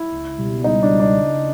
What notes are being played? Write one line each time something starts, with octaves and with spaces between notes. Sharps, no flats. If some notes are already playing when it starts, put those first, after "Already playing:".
Already playing: E4
C#2
B2 G3
C#2 D#4
D4
B2 G3
D4
C#3